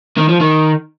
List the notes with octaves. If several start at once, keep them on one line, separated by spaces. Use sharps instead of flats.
D#3
F3
D#3